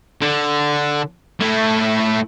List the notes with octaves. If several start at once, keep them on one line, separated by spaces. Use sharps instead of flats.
D3
A3 E4